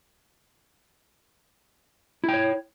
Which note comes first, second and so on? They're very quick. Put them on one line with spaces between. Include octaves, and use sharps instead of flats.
E4 G5 C#5